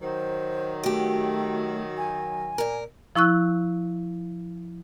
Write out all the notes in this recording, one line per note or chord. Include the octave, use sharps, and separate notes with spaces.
D#3 F#3 C5
A3 F#4 G4
G#5
A#2 A#4
F3 E4 C#6 E6 F#6